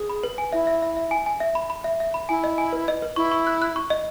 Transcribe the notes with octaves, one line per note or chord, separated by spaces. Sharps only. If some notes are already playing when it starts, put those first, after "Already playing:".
Already playing: G#4
B5
B4
G#5
E4 E5
E5
E5
E5
G#5
G#5
E5
B5
B5
E5
E5
B5
E4 G#5
D#5
G#5
B4
D#5
B4
E4 C#6
C#6
F#6
F#6
C#6
D#5